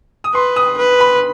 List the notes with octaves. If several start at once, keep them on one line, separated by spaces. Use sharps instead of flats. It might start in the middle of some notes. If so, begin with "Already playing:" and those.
D#6
B4 C6
D#6
B4
B5